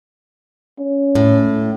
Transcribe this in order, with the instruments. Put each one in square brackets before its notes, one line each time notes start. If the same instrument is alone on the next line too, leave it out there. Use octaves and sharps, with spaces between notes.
[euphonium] C#4
[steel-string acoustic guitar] A2